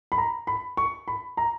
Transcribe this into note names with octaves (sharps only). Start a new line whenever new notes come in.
B5
A#5
B5
C#6
B5
A#5